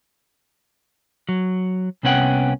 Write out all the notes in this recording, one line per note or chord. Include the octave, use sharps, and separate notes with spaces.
F#3
C2 C3 B3 C#4 F#5 G5